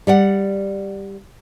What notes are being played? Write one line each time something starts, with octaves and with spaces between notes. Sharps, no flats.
G3 D5 F#5